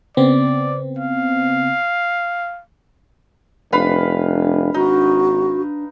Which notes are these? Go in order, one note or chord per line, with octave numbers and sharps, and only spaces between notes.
C#3 B3 C4 D5
F5
F1 D4 B4 F5 B5
G#1 D#4 F#4